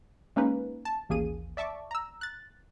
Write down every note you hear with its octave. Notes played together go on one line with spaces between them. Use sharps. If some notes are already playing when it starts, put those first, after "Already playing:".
G#3 A#3 C#4 D#4 B4
A5
A1 D#2 A#3 G#4 D#7
D5 E5 A5 C#6 D6
A#5 E6
F#6 A6